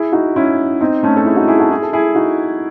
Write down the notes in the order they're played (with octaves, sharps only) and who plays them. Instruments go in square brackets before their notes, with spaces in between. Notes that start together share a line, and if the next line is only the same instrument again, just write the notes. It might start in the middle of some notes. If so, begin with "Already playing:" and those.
Already playing: [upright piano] E4 G#4
D#4 F#4
C#4 E4
C4 D#4
A3 C#4
A4
E4 G#4
D#4 F#4
E4 G#4
F#4 A4
E4 G#4
A4
E4 G#4
D#4 F#4